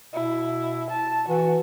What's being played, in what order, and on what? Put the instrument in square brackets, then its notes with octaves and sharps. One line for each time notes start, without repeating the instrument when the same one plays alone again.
[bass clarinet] B2 [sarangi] E4
[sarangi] A5
[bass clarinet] E3 [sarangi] F#4